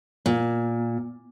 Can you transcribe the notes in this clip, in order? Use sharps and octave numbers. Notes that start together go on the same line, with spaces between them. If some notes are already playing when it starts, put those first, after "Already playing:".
A#2